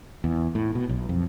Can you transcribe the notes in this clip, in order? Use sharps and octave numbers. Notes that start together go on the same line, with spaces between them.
E2
A2
B2
B1
F2